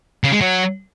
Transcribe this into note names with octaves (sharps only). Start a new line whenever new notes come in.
C#3
G#3
F#3